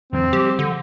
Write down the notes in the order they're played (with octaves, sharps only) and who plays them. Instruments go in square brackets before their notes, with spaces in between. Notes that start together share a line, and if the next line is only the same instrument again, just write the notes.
[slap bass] E2 D3 F#3 [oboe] C4
[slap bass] F3 G3 [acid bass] G4
[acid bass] D3